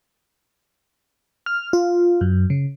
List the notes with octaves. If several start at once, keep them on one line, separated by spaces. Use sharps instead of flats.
F6
F4
F#2
C#3